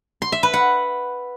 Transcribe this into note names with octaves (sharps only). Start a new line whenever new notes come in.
C6
E5
B4
F#5